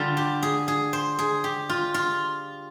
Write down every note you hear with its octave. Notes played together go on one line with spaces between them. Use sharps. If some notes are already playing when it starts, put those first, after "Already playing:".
Already playing: D3 G3 F4
G4
G#4
G#4
C5
G#4
G4
F4
F4